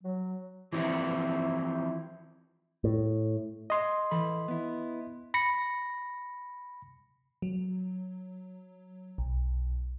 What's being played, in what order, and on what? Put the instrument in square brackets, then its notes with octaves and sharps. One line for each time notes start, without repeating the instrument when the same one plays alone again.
[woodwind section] F#3
[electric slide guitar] E3 F3 C4 E4 F#4
[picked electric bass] A2
[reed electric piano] D#5 C6
[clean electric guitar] E3 A4 B5
B3 E4
[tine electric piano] B5 A#6 C#7
[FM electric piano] F#3
B1